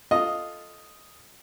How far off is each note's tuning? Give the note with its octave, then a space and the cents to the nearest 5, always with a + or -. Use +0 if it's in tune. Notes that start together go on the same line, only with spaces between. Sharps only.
F4 +0 A4 +0 D#5 +0